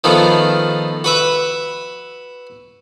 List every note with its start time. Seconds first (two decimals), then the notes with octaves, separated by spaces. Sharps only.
0.04 D#3 F3 A3 B3
1.04 F#4 B4 E5